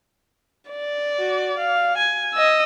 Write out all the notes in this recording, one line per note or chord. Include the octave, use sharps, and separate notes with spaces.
D5
F#4
F5
G#5
D#5 E6